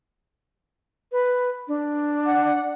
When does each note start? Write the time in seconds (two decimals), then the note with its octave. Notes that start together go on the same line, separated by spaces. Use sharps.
1.12 B4
1.68 D4
2.26 F#5